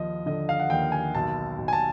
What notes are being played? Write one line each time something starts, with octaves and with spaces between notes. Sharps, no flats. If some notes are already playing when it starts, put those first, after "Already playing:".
Already playing: D#2 F3 D#5
D3 D#5
F5
F#5
D#2 G5
G#5
B1 A5
B1
G#5
A5